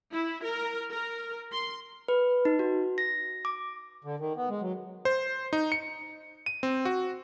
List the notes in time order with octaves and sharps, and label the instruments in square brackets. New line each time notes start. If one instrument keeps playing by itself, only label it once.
[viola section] E4
A#4
A#4
C6
[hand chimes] B4
D#4
F#4
A#6
D6
[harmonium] D3
D#3
B3
G#3
F#3
[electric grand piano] C5
D#4
C#7
D#7
C4
F#4